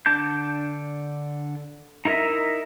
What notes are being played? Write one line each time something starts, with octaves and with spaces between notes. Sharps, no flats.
D3 D4 A5 D6 G6
D#4 E4 A#4 D#5 E5